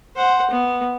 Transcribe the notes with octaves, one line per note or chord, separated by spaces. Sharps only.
C5 F#5
B3